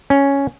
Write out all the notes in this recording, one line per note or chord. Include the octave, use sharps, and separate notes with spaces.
C#4